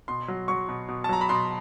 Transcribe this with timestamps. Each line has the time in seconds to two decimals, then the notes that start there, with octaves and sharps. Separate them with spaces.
0.08 B2 C6
0.28 F#3
0.48 F#3 C#6
0.69 B2
0.88 B2
1.04 A5
1.09 F#3 A#5
1.21 B5
1.29 B2 C6